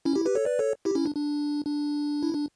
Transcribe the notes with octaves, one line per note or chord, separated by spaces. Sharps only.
C#4 E4
E4 G4
G4 B4
A4 C#5
B4 D5
A4 C#5
E4 G4
C#4 E4
D4
D4
D4
E4
D4